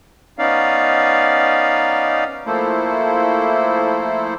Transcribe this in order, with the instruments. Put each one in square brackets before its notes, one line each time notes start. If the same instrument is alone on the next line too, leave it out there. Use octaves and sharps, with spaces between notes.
[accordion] B3 C#4 D#4 D5 F5
F3 A3 A#3 E4 A4 C5